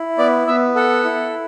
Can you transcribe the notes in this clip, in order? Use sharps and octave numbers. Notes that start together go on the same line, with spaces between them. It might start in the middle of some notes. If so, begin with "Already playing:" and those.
Already playing: E4
B3 D5
B3 E5
A4 F#5
E4